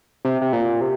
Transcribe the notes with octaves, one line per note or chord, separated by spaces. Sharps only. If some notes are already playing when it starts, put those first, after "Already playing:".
C3
C3
A#2
C3